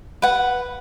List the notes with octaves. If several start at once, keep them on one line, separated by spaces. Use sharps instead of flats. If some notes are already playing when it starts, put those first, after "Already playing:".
B4 F#5